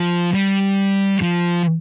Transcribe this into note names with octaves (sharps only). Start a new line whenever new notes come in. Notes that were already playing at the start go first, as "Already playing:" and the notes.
Already playing: F3
G3
F3